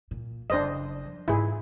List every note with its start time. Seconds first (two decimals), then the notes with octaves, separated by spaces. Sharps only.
0.11 A#2
0.50 F#1 D4 C5 D#5
1.05 F3
1.28 G#2 E4 F4 G#4